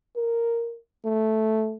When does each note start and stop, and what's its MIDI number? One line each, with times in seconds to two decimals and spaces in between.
0.16 0.78 70
1.05 1.77 57